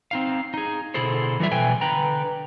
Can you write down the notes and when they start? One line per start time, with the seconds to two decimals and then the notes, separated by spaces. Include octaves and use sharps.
0.11 C4 D#4 F5
0.54 D#4 G#4
0.94 B2 D3 E4 G#4 A4 C5
1.39 E2 E3 F3 G3 E5
1.52 B2 B4 E5 G5 G#5
1.81 D3 B4 G5 A#5